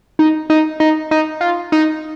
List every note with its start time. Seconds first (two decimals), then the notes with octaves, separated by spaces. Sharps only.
0.19 D#4
0.50 D#4
0.80 D#4
1.11 D#4
1.41 F4
1.72 D#4